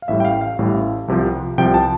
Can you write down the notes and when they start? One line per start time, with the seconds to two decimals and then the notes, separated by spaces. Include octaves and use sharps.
0.02 F5
0.08 A1 A2 G3 E5
0.20 G5
0.25 F5
0.41 F5
0.59 A1 A2 G3
1.08 C2 C3 F3
1.58 C2 C3 F3 G5
1.74 A5